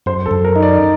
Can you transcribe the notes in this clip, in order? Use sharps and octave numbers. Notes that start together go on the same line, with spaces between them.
F#2 C5
A4
F#2
A#4
D#4
D5